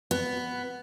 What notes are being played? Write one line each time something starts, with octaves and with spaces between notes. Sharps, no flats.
B3